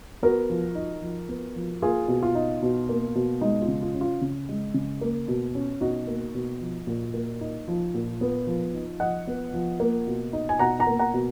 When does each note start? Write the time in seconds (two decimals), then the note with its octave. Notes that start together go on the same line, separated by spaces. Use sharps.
0.23 B3 F#4 A#4
0.50 F3
0.75 D#4
1.02 F3
1.29 B3
1.56 F3
1.82 A#3 F4 G#4
2.08 B2
2.23 F4
2.35 D#4
2.62 B2
2.89 A#3
3.15 B2
3.41 G#3 D#4
3.62 F4
3.68 C#3
3.82 F4
3.94 C#4
4.01 F4
4.21 C#3
4.49 G#3
4.74 C#3
5.01 A#3
5.28 B2
5.55 C#4
5.81 B2 D#4 F#4
6.07 A#3
6.34 B2
6.61 F3
6.87 A#2
7.14 A#3
7.41 D#4
7.68 F3
7.94 A#2
8.21 B3
8.47 F3
8.74 D#4
9.00 F3 D#5 F#5
9.27 B3
9.54 F3
9.80 A#3
10.07 B2
10.33 D#4
10.49 G#5
10.59 B2 F#5 A#5
10.79 F#5 A#5
10.87 A#3
10.99 F#5 A#5
11.14 B2